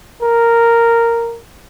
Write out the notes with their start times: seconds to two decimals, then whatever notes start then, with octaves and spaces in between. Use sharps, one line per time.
0.22 A#4